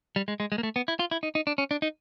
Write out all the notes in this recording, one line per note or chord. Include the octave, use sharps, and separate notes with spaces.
G3
G#3
G#3
G#3
A#3
A3
B3
E4
F4
E4
D#4
D#4
D4
C#4
D4
D#4